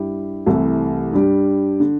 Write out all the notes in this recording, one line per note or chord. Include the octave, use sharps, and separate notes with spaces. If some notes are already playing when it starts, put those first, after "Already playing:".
Already playing: G2 G3 E4 G4
C2 C3 E3 A3
G2 G3 D4 G4
D3